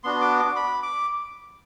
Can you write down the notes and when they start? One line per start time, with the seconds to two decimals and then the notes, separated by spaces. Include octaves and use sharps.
0.04 B3 D4 F#4 C6
0.21 D6
0.39 D6
0.56 B5
0.83 D6